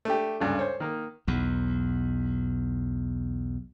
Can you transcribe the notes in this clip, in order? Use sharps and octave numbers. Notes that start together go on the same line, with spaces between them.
A3 D4 G4
D2 G2 C#3
C5 C#5
D#3 A#3
B1 E2